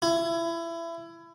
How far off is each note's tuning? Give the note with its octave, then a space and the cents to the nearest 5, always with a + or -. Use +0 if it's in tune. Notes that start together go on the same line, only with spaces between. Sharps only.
E4 +25